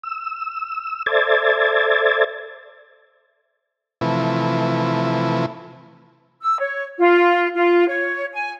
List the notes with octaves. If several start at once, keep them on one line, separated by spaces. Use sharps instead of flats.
E6
A4 C5 D5 E5 G#6 A6
C3 E3 F3 A3 E4 B4
E6
C#5
F4
F4
C#5
G#5